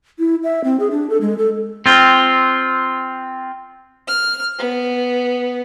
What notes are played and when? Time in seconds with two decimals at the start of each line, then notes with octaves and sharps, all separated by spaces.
0.19 E4
0.44 E5
0.64 C4
0.80 G#4
0.91 D4
1.10 A4
1.21 G#3
1.38 A4
1.86 C4 F4
4.08 F6
4.59 B3